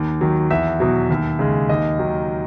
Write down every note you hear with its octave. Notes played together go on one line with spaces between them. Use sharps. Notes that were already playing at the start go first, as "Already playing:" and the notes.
Already playing: D#2
D#3 F#3
E2 E5
B2 F#3
D#2
C#3 G#3
D#2 D#5
D#3 F#3